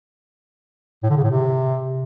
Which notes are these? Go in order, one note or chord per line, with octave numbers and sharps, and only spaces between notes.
A2
D3
C#3
A2
C3